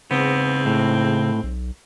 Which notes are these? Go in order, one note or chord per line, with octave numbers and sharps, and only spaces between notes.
E2 G#2 C#3 B3 C4
A2
B1